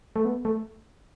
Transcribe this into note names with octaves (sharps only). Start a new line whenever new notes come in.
A3
B3
A3